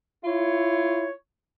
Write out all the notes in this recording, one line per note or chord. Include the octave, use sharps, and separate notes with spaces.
E4 F4 C#5